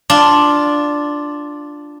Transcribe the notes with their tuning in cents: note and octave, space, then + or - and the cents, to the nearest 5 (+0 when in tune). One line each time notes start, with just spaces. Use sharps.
D4 +0 F4 +0